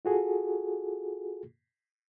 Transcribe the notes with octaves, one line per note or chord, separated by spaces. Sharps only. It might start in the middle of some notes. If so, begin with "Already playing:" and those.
F4 F#4 G#4 A4